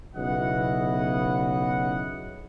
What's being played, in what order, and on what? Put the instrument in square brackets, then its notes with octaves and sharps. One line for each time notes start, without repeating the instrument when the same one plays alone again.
[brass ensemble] B1 C#3 B3 E4 D#5 F#5